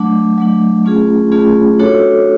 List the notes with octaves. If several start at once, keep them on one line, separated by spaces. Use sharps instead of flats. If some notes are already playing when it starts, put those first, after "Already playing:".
Already playing: F#3 A3 D4
F#3 A3 D4
A3 C#4 F4 G#4
A3 C#4 F4 G#4
D4 F#4 A4 C#5